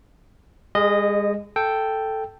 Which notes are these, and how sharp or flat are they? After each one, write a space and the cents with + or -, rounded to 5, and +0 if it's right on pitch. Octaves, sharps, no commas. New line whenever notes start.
G#3 -40 G#4 +25 D#5 -10
A4 +0 G5 +0